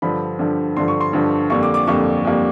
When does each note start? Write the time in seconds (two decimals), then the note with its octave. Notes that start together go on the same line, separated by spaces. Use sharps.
0.02 G2 D3 F3 B5
0.39 G2 D3 F3
0.76 G2 D3 F3 C6
0.88 C#6
1.01 C6
1.13 G2 D3 F3
1.50 F2 D3 G3 A#3 C#6
1.63 D6
1.74 D6
1.87 F2 D3 G3 A#3 C#6
2.24 F2 D3 G3 A#3